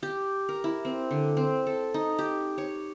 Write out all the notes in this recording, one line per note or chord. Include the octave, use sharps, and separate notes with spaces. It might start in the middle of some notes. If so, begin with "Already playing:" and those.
G4
A#4
E4
C4
D3
C4
A4
D#4
G4
C#5